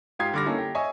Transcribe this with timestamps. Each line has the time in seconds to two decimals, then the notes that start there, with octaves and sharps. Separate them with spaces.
0.19 G#2 F4 G4 D#6 G#6 C7
0.34 D3 G3 D6 F6 A#6
0.45 A#3 C#4 D#4 E4 A4
0.58 G4
0.75 C#5 D#5 E5 G#5 C#6